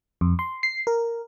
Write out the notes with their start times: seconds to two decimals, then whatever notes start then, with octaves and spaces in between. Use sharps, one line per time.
0.21 F2
0.39 C6
0.63 C7
0.87 A#4